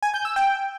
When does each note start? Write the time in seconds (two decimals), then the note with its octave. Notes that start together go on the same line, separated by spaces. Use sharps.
0.02 G#5
0.14 G6
0.25 E6
0.36 G5